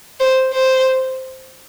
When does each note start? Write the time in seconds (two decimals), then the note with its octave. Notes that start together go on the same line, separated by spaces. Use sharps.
0.20 C5
0.53 C5